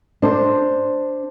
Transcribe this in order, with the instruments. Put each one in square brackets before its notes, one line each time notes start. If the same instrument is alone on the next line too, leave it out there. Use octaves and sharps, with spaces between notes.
[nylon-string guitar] D4 C5